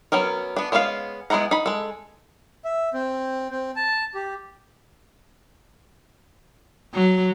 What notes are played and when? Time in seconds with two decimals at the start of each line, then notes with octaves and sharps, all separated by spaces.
0.12 F#3 B3 C#4 A#4
0.56 B3 D4
0.72 G#3 B3 C#4 C5 F5
1.30 G#3 B3 E4 F#5 A#5
1.51 D#4 B5
1.66 G#3 A4
2.64 E5
2.94 C4
3.50 C4
3.76 A5
4.14 G4
6.94 F#3